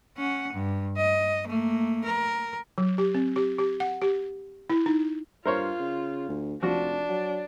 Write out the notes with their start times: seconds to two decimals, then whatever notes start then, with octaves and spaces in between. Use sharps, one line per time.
0.17 C#4 F#5
0.53 G2
0.97 D#5
1.47 A3 A#3
2.05 A#4
2.78 F#3
2.98 G4
3.14 C4
3.36 G4
3.58 G4
3.80 F#5
4.02 G4
4.70 E4
4.86 D#4
5.45 G2 F4 A#4 C5 C#5
5.80 C#3
6.29 D2
6.62 F1 F3 D4 F#4
7.09 F#3